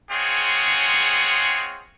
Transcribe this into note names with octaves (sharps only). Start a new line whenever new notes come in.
G#3 C4 F4 G#4 C#5 F#5